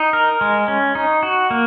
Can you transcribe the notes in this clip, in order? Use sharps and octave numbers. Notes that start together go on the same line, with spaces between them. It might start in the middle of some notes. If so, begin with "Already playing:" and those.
Already playing: D#4
A#4
G#3
C#4
D#4
F#4
A#3